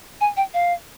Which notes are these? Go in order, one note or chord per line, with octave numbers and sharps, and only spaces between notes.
G#5
G5
F5